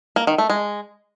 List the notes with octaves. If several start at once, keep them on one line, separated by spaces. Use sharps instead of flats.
A#3
D#3
A3
G#3